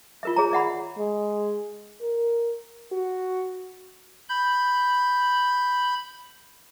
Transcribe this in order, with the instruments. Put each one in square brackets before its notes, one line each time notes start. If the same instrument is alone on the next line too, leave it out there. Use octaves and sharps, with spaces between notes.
[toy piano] F4 A#4 E5
G#4 C#5 A#5
D5 E5 F#5 B5
[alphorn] G#3
A#4
F#4
[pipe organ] B5 G6